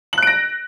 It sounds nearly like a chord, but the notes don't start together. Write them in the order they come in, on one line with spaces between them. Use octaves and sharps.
F#7 F#6 D7 A#6